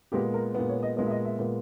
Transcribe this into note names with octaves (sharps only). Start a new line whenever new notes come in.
A#2 G#3 B3 G4
A#4
A#2 G#3 B3
C#5
D#5
A#2 G#3 B3 D#5
E5
D#5
E5
A#2 G#3 B3